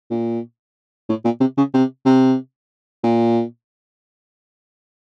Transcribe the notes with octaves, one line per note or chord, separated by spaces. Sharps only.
A#2
A2
A#2
C3
C#3
C3
C3
A#2